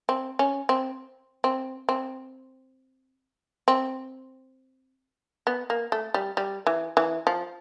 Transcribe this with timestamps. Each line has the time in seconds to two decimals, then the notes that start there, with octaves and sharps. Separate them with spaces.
0.09 C4
0.39 C#4
0.69 C4
1.44 C4
1.89 C4
3.68 C4
5.47 B3
5.70 A#3
5.92 A3
6.14 G3
6.37 G3
6.67 E3
6.97 E3
7.27 F3